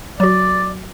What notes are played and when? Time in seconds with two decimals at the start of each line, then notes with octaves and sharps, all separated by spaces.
0.20 F#3 F#4 D5